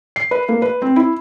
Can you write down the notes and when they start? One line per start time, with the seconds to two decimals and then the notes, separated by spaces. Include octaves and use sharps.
0.16 C7
0.31 B4
0.49 A#3
0.62 B4
0.82 C4
0.96 E4